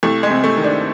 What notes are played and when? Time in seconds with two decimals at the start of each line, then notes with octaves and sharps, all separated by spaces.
0.03 C2 A3
0.23 G#3
0.30 C3
0.44 A3
0.57 D#3
0.64 D4